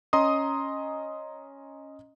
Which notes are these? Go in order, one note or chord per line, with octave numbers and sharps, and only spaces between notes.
C#4 D#5 A#5 C6 D#6